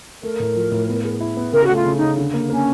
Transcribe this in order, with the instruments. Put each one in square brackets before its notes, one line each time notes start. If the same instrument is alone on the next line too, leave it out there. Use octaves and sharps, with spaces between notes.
[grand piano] A3 [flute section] A#4
[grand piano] A2
F3
A2
B3
G#4
E4
B3
[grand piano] C#3 [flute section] A#4
[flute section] F#4
[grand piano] A3
[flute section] F4
[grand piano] C#3
[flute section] D#4
[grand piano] C#3
D3
A#3
[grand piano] A#3 [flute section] C#4